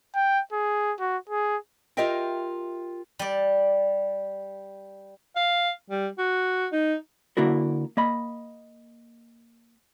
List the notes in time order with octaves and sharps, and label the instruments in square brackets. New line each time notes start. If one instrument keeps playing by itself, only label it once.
[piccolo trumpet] G5
G#4
F#4
G#4
[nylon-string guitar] F4 G4 A#4 D#5 E5 G5
[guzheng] G3 D5
[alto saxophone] F5
G3
F#4
D#4
[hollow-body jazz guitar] D3 A#3 E4 F#4 A#4
A#3 D#5 B5